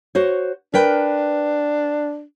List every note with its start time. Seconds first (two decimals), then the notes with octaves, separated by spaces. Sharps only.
0.15 F#4 C5 C#5
0.74 D4 A#4 B4 G5